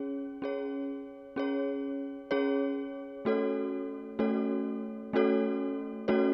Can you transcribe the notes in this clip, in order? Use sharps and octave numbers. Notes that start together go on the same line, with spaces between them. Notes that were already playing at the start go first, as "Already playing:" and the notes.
Already playing: C#4 G#4 C#5
C#4 G#4 C#5
C#4 G#4 C#5
C#4 G#4 C#5
A3 C#4 F#4 A4 C#5
A3 C#4 F#4 A4 C#5
A3 C#4 F#4 A4 C#5
A3 C#4 F#4 A4 C#5